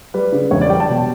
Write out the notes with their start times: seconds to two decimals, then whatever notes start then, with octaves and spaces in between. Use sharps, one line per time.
0.14 G3 B4
0.32 C#3
0.51 E1 C#5
0.61 D5
0.70 G3 G5
0.80 A5
0.89 B2